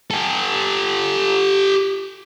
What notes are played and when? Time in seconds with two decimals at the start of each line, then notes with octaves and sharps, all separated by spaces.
0.11 G4 A4